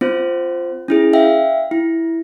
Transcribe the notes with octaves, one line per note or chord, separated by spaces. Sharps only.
C4 F4 C5
C#4 E4 G#4
E5 F5 G5
E4